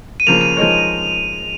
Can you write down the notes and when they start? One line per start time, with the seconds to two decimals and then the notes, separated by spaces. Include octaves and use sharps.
0.20 D#7
0.27 C#3 F3 A#3 F7
0.41 D#7
0.57 F3 G#3 D#4 A#4 C#5